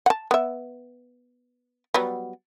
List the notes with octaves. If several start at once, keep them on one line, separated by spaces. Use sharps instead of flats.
F#5 A5
B3 E5
F#3 G3 B3